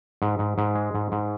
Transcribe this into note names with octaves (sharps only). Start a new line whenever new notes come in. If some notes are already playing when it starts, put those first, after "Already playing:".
G#2
G#2
G#2
G#3
G#2
G#2